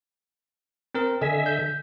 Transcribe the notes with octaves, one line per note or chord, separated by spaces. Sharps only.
C4 A#4
D3 D#5 E5 G#5
G6